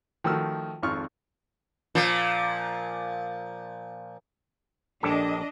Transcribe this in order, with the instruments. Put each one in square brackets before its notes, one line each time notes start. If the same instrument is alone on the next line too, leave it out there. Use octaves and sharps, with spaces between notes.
[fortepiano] D#3 F3 A3 F#4 E6 F6
G#1 F2 F4 C#6 F6
[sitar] A#2 F3
[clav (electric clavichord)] A#1 G4 A4 [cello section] D4 D#5